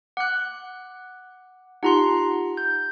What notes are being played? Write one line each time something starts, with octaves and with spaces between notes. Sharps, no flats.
F#5 D6 F#6
D#4 F4 G4 F#5 A#5 C6
G6